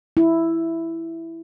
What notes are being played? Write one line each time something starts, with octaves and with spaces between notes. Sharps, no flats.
E4